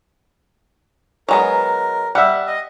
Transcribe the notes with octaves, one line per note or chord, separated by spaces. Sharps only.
F#3 G#3 B3 A#4
G3 E5 F#5
D#5